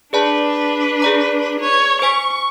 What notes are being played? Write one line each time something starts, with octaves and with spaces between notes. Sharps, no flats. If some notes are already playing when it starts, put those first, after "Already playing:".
D4 G#4 B4 D5 A5
G#4 D5 A#5
C#5
C5 G#5 C#6 B6